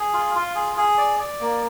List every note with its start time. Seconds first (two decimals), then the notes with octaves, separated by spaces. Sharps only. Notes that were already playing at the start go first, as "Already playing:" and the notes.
Already playing: G#4
0.14 F4
0.35 F4
0.55 G#4
0.77 G#4
0.98 D5
1.20 D5
1.41 A#3